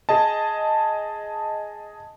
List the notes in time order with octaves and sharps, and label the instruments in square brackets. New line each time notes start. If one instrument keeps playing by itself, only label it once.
[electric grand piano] G#4 D#5 A5